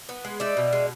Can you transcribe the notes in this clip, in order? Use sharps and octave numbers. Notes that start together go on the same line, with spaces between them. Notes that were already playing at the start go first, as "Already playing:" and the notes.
B3
G#3
D#4 D5 E5
B2
G#3